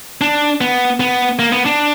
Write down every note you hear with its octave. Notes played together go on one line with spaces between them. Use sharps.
D4
B3
B3
A#3
B3
D4